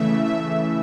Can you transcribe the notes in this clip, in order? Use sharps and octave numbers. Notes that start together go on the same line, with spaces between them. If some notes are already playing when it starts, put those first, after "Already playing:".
Already playing: C#3 E3 A3 E5
E5